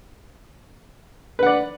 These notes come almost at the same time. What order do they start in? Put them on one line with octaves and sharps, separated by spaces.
B4 F#5 D5